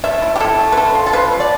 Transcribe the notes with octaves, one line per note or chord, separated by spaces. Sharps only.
A3 E5
E4
G4
E4 A4
A3
B4
D3 A4
F3
A4
F3 B4
A3
D5